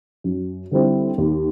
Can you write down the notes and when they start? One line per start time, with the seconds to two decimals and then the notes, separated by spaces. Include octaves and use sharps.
0.24 F#2
0.71 D3 G3 C4 E4
1.18 D#2